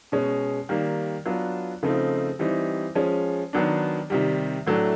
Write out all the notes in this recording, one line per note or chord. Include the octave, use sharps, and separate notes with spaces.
B2 G#3 C#4
D#3 G3 A#3
F#3 B3 D4 F4
C#3 F3 A3 C4 D#4
E3 G3 C4 D#4
F3 G#3 C#4
D#3 F#3 B3 D4
C3 D#3 G3
A2 F#3 A3 D4